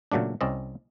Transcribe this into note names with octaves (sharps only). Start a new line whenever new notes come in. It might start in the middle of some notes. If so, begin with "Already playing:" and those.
A#2 C#3 F#3 A3 D4
C2 C4 C#4 D5 D#5